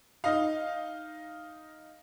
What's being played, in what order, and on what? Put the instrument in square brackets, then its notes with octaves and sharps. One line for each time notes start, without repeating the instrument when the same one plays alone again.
[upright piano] D#4 D#5 F5